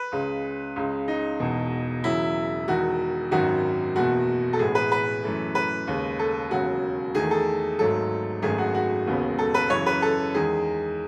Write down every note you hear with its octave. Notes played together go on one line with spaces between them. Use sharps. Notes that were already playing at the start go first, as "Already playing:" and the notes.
Already playing: B4
C#2 C#3 G#3
C#2 C#3 G#3
D#4
E1 E2 B2
E1 E2 C#3 F#3 E4
E1 E2 D#3 F#4
G#1 F#2 D#3 F#4
F#1 E2 B2 F#4
A4
A1 A2 G#3 B3 G#4
B4
B4
F#2 E3 A3
B4
D#2 C#3 G#3
A4
E1 D#2 C#3 F#3 F#4
E2 D#3 A3 G#4
A4
G#1 G#2 F#3 A3 A4
G#1 F#2 D#3 A3 G#4
F#4
F#4
E1 D#2 C#3 G#3 B3
A4
B4
F#2 C#3 E3 C#5
B4
A4
E2 D#3 G#3 G#4